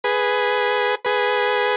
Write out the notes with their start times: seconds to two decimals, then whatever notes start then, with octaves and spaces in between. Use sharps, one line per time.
0.04 G#4 B4
1.05 G#4 B4